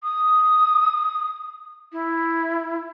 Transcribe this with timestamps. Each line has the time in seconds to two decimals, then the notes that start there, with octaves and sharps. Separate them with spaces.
0.03 D#6
1.92 E4